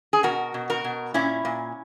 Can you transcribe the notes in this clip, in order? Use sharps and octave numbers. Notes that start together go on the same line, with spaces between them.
G#4
B2 F#4 A#4
B2
F#4 A#4
B2
A#2 C#4 E4
A#2